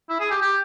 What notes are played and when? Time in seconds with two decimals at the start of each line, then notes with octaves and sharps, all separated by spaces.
0.10 E4
0.20 G#4
0.31 G4
0.42 G4